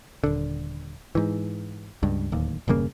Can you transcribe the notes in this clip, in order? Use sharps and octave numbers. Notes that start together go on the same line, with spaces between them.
D#1 D3
G#2 E3
C#2 G2
D1 D#2
E1 G2 C#3 A#3